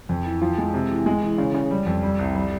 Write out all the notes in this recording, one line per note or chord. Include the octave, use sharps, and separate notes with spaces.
F2
E3
F3
G#3
C3
E3
G#3
E3
C#3
C#3
G3
F2
G3
C2
G3